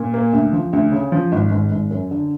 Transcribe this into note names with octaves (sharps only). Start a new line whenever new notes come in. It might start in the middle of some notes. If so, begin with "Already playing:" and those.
Already playing: A#2
A#3
D2
F3
D2
C#3
F3
G#1
G#1
G#1
F#2
D3